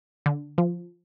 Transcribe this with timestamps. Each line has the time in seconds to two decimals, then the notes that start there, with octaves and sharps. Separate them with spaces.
0.26 D3
0.58 F3